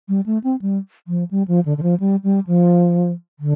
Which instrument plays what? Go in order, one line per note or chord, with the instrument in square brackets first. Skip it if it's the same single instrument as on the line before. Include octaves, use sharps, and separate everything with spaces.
[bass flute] G3
A3
C4
G3
F3
G3
F3
D3
D3
F3
G3
G3
F3
D3